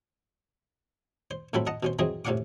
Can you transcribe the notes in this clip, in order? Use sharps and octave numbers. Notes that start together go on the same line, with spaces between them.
C5
A2 F#3 C4 A4 C5 B5
D#5 F#5 A5 A#5
B2 C#4 C5
E3 F#3 C4 G#4 D#5
A2 C3 C#4 F5 F#5 D6